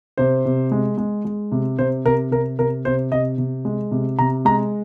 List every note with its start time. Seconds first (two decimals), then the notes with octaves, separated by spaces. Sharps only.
0.18 C3 C5
0.45 C3
0.72 G#3
0.98 G#3
1.25 G#3
1.52 C3
1.79 C3 C5
2.05 C3 A#4
2.31 C3 A#4
2.59 C3 A#4
2.85 C3 C5
3.12 C3 D#5
3.38 C3
3.65 G#3
3.91 C3
4.19 C3 A#5
4.45 G#3 A#5